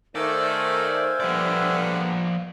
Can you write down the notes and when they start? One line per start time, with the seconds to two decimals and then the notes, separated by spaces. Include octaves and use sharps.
0.15 D#3 A3 C5 D5 E5 F5 G#5
1.20 D3 F3 G3 B3 D5